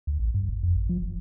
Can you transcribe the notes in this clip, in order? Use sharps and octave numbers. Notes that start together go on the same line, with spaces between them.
D2
A1
G2
G1
F2
G#1
F3
F#1